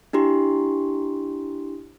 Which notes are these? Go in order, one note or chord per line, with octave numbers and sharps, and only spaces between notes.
D4 E4 G4 C6